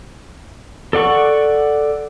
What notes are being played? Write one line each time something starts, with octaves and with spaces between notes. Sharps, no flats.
A4 D5 F#5 C#6